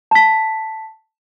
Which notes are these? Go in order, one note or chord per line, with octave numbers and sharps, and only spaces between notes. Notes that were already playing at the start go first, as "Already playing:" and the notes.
A5 B6